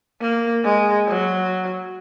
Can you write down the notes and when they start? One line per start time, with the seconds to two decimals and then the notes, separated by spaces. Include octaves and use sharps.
0.21 A#3
0.64 G#3
1.07 F#3